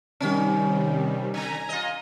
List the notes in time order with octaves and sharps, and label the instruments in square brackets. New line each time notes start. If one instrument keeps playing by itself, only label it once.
[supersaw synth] C3 D#3 G3 [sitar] C#4
[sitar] D3 [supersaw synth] G#5 A#5
[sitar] F4 D#5